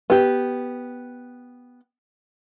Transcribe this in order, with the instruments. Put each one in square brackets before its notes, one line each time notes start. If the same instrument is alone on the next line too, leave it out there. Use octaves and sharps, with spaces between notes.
[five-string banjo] B3 G4